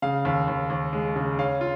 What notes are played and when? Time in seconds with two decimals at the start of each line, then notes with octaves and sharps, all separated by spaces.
0.02 C#3 F5
0.25 D#2
0.48 D#2
0.70 D#2
0.93 G#3
1.16 C#3
1.39 C#4 F5
1.61 F4